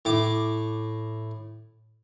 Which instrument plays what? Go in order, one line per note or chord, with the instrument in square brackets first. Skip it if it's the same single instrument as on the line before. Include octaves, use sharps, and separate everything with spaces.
[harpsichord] A2 D6